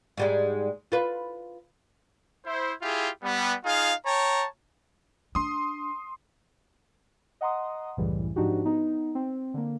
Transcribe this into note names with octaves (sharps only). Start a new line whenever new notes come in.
G#2 G3 G#3
F4 B4
E4 C5
E4 F4 G4 G#4
G3 B3
D#4 F4 G#4 F5
C#5 G5 A5 A#5
D4 C6 D#6
D#5 F#5 A#5 C6 D#6
C2 F#2 A2 C#3 E3 G3
G#2 F3 D4 D#4 F#4 G4
B3 D#4
C4
D3 A#3